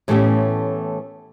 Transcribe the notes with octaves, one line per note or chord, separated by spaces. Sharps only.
A2 E3 A3 B3 C#4 G4